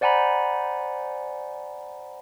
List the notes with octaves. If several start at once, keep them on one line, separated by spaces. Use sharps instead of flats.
C5 D5 F#5 G#5 A#5 B5